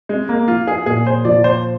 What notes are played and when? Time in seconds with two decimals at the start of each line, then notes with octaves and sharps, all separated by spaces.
0.09 G#3 C4
0.29 A#3
0.48 F3 F4
0.67 G#4
0.86 A#2 G#4
1.07 C5
1.25 F3 D5
1.44 C5